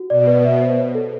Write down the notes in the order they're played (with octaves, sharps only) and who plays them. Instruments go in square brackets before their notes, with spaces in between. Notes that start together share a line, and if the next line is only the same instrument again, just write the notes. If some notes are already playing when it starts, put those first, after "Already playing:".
Already playing: [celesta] F#4
[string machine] B2 [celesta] D5
[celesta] B4
E5
C5
C#5
A4